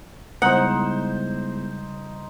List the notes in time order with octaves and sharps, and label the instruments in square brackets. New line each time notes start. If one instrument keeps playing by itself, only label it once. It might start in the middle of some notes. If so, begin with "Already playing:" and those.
[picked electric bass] C#3 G3 [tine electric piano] G#3 B3 E4 [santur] D#4 C5 [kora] F#5